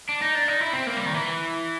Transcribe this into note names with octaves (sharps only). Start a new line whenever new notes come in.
D4
D#4
D4
D#4
E4
C4
A#3
G3
D#3
E3